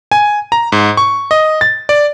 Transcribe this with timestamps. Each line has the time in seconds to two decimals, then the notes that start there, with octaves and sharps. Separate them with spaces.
0.12 G#5
0.52 A#5
0.72 G#2
0.97 C#6
1.31 D#5
1.61 A6
1.89 D5